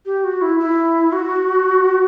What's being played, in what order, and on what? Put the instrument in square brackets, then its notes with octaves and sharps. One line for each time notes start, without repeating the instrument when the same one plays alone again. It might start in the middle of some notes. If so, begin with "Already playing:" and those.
[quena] G4
F#4
E4
E4
F#4